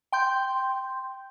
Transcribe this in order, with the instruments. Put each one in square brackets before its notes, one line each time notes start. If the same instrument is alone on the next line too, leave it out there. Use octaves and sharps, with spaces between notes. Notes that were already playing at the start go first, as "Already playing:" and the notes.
[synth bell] G5 C6 G6